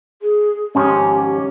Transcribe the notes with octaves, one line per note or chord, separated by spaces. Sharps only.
G#4
G#2 D#3 F3 C#4 G4